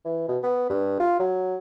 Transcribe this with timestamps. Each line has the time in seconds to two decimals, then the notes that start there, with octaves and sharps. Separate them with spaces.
0.05 E3
0.28 B2
0.43 B3
0.70 G2
1.00 F4
1.19 F#3